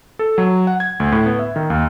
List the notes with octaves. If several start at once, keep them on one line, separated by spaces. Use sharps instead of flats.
A4
F#3
F#5
G#6
D2
A2
B3
E5
D#3
D#2